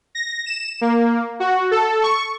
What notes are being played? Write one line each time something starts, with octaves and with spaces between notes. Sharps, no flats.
A#6
E7
A#3
F#4
A4
C#6